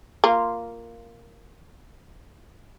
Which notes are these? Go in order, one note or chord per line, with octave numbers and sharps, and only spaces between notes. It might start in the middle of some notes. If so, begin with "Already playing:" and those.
A#3 F4